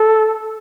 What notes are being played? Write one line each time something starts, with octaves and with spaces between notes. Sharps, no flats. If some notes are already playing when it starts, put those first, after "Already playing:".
Already playing: A4